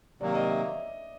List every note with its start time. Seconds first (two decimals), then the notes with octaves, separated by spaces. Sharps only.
0.21 C3 D#3 F#3 A#3 D5
0.35 D#5
0.50 E5